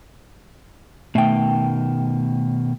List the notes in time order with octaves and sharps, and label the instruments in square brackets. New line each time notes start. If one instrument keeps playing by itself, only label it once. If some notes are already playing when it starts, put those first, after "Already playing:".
[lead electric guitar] B2 D#3 [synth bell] A3 G5